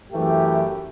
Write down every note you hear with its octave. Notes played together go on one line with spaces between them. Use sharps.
F#2 E3 A3 G4